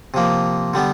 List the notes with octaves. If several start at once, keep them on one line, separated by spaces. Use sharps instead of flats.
C3 F3 A#3
D3 G3 B3